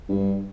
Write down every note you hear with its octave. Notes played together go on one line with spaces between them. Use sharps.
G2